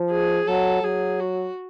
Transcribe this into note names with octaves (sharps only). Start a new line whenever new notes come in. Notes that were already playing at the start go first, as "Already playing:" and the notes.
Already playing: F3
G#4
F#3 A4
F#3 G#4
F#4